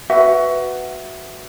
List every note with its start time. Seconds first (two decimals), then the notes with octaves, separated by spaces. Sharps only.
0.10 F#4 B4 E5 F#5